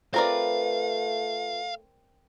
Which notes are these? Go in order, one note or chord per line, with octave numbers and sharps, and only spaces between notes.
A3 C4 F4 A#4 B4 D5 F5